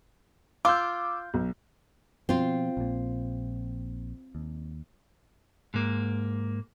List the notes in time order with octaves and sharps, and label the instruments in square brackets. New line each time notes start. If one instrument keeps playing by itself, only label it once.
[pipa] F4 [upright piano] D6 E6 G6
[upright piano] B1
[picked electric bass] B2 F3 [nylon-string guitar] C4 F4
[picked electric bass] A#1 A#2
D#2
[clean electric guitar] G#2 A#3